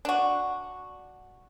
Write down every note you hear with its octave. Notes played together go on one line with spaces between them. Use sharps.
D4 F#4